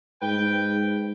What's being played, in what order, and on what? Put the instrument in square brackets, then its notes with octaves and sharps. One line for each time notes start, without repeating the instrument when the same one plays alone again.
[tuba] G#2 [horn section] B4 G5